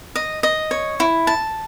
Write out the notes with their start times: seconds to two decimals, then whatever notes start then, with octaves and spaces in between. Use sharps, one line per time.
0.15 D#5
0.43 D#5
0.71 C#5
1.00 E4
1.27 A5